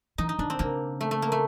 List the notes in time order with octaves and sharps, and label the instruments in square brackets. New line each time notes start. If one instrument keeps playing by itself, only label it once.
[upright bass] E3 [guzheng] D#4
[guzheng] D#4
[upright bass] D#3 [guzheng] D4
[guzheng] C4
[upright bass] C#3 [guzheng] A#3
[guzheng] A3
A3
A#3
A3